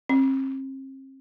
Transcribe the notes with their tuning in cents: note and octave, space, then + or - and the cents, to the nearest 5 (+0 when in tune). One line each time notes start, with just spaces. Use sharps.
C4 +40